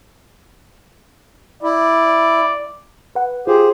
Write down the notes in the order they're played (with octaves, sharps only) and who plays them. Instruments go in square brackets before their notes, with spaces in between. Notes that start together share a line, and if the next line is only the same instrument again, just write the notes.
[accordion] E4 [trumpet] D5
[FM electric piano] B4 F#5
[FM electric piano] F4 [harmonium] G4 G#4 C5